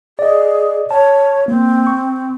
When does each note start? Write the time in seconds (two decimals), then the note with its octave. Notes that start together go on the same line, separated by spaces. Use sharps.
0.19 G#4 D5 D#5
0.91 C#5 A5
1.48 A#3 C4
1.87 C#6